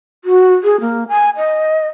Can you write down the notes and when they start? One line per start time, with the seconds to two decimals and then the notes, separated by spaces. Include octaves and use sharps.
0.25 F#4
0.64 G#4
0.81 A#3
1.09 G#5
1.37 D#5